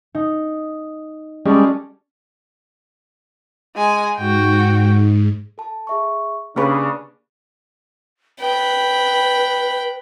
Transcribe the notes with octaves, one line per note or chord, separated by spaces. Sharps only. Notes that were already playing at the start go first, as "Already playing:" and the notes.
D#4
G3 G#3 C#4 A4 D5
G#3 G#5
G#2 F#4 G5
A4 A5
G#4 E5 C#6
C#3 A#3 D4 G4 B4 C#6
B4 G5 B5